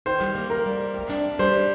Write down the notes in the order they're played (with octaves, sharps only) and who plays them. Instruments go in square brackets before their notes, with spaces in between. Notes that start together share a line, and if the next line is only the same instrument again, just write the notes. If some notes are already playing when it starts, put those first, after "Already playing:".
[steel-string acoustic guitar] D#3 [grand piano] C5
[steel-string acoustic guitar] G3
A#3
[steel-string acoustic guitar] A#3 [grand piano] A#4
[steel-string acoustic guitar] G3
A#3
C3
D4
G3
[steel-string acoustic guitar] G3 [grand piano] C5
[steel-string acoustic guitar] D4